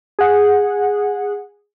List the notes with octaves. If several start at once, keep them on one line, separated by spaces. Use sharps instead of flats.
G#4 F#5